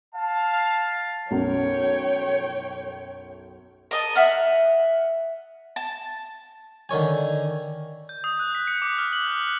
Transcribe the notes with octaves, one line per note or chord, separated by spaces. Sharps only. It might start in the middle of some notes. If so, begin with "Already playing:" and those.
F5 A5
B1 F#2 C#5 G5
A#4 D#5 A5
E5 F#5 F6
A5
D3 D#3 C#5 G#5
G6
D#6
F#6
B6
C#7
D6
F6
F#7
F#6